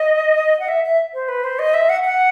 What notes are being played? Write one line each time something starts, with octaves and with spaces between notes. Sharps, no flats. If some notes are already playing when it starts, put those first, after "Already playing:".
Already playing: D#5
F#5
E5
E5
C5
B4
C5
D#5
E5
F#5
F#5